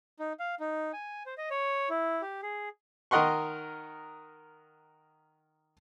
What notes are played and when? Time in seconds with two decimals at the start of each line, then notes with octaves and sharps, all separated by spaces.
0.19 D#4
0.40 F5
0.60 D#4
0.93 G#5
1.26 C5
1.38 D#5
1.51 C#5
1.90 E4
2.22 G4
2.43 G#4
3.11 D#3 A#4 D#5 F#5 C6 C#6